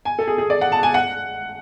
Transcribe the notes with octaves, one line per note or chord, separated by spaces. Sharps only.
G#5
A4
G#4
G#4
D5
F#5
A5
G#5
F#5